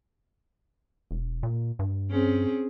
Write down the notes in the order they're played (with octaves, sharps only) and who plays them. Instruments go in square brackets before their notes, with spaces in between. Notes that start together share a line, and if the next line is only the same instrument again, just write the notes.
[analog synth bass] E1
A#2
G2
[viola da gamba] C4 C#4 G#4